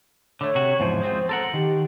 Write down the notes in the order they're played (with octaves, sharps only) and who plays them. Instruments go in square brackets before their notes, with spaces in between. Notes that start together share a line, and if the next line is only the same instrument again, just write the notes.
[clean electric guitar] D3 A3 [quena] C#5
[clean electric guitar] C3 F#4
[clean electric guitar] E2 G#2 F3 [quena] C5
[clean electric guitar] G#3 C4 F4
A4 A#4 F#5
[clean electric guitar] D#3 [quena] G4